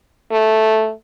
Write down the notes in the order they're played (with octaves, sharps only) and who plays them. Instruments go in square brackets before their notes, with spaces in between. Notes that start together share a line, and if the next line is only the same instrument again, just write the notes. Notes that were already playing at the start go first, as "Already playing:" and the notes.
[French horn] A3